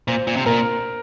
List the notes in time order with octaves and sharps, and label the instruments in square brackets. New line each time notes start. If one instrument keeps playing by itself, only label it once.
[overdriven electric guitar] A#2 [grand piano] C5
[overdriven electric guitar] A#2
C3
[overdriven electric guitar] A#2 [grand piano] A#4